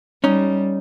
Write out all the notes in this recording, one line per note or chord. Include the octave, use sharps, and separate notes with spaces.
G3 C#4 D#4